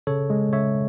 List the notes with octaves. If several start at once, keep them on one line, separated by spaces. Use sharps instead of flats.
C#3 A4 C#5
G#3
C#3 C#5 E5